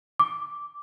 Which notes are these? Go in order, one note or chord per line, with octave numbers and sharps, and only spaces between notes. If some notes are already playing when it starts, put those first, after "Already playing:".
D6